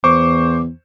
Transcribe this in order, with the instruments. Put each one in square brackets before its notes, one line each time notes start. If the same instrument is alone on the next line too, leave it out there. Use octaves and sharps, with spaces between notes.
[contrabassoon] E2 [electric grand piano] C5 C#6 [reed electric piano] D6